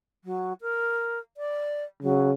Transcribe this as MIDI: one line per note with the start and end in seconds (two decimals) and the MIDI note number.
0.24 0.53 54
0.61 1.18 70
1.37 1.84 74
2.02 2.34 49
2.02 2.30 54